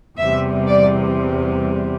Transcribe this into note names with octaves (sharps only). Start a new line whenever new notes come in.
E2 C3 G3 E5
D5